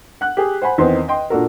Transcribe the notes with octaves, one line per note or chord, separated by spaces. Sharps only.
F#5 F#6
G4 G#4
C5 F#5 G#5 B5
E2 D#3 C4 D#4 C5 C6
D#5 G5 C6
A#2 A#3 D4 F#4 A4 A#4